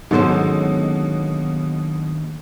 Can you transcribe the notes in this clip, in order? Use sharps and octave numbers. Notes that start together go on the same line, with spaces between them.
D#2 G#2 B2 D3 F#3 C#4 A4 C5